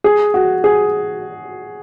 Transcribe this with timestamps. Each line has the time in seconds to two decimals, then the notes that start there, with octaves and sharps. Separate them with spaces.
0.04 G#4
0.34 F#4
0.64 G#4